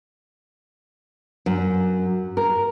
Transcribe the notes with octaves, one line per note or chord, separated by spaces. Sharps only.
F#2
A#4